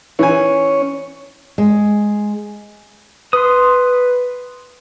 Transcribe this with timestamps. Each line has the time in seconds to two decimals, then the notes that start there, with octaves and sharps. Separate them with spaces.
0.19 E3 C#4 C#5 G#5
1.58 G#3
3.33 B4 C6 D#6